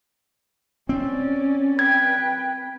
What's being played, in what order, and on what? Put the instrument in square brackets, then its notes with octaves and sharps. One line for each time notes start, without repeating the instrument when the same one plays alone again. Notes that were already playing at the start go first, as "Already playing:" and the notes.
[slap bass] C4 [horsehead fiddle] C#4 D5
[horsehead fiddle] B4 G5 [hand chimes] G#6